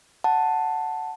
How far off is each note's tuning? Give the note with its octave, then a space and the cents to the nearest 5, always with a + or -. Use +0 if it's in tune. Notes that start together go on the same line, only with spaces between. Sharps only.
F#5 +0 A5 +0